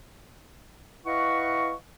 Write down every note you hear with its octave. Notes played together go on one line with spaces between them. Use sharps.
E4 B4 D#5 F5 F#5 C#6